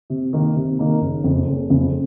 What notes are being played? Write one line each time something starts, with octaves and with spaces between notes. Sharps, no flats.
C3
D#3 A#3 D#4
C3
D#3 A#3 D#4
F#1
F2 C#3
F#1
F2 C#3